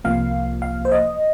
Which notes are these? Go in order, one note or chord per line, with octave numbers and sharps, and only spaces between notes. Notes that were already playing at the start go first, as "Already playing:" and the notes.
C2 C3 F3 A#3 F5
F5
C5
D#5